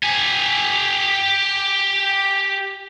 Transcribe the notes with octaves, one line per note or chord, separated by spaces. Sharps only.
G4 G#5